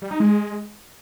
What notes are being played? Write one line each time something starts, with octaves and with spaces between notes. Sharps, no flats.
G3
D#4
G#3